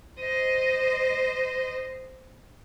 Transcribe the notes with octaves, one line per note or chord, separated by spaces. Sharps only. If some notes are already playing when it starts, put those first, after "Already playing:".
C5 D#5